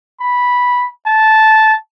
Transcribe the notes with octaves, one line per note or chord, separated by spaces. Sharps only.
B5
A5